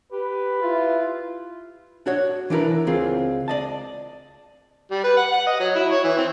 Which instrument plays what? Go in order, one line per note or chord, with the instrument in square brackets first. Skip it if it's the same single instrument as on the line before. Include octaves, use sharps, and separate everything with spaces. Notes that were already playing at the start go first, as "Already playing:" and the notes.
[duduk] G4 [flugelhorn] B4
[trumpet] E4 [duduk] F4
[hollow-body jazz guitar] D4 F#4 C#5
E3 D4 E4 A#4 B4
C#2 C4 F4 G#4
D5 D#5 A5
[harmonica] G3
B4
F#5
F#5
D#5
F#3
E4
C#5
E3
C4